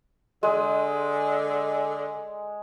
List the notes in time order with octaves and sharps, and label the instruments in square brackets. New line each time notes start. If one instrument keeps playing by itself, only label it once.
[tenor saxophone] D3 [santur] G#3